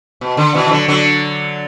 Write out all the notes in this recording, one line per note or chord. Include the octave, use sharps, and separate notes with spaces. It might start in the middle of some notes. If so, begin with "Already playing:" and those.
B2
D3
B2 E3
E3
D3 F#3
D3 F#3